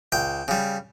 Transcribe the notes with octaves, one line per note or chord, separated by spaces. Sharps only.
C#2 G5
C#3 G3